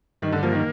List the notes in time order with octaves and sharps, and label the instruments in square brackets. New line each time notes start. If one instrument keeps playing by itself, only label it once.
[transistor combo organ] G2 [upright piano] D#3
[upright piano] D3
[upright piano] F3 [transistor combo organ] A#3
[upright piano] D#3